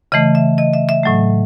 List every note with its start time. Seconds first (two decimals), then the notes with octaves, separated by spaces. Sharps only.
0.12 C#3 E3 A3 D#5
0.35 E5
0.58 D#5
0.73 E5
0.89 E5
1.03 A2 F#3 A3